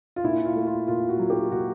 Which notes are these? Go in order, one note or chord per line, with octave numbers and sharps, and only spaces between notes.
F4
A#2 E4
F4
A3
F4
A#2 F4
F#4
F#3
G4
A#2 F#4